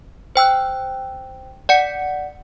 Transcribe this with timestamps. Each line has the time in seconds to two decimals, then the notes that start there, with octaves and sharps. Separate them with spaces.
0.36 C5 G5 E6 F#6
1.69 D5 F#5 C#7